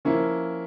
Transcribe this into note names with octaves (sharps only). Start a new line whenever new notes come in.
F3 A#3 C#4 E4